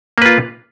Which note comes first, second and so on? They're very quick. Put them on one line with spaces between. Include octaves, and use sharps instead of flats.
A#3 B4 F4